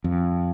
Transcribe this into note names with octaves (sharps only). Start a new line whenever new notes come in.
F2